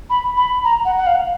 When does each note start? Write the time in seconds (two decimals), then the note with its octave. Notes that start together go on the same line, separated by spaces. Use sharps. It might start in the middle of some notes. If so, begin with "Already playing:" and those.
0.10 B5
0.37 B5
0.64 A#5
0.85 F#5
0.97 F#5
1.07 F5